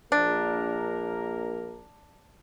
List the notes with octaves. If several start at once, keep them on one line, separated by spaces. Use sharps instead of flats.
A#1 A#3 D4 A#4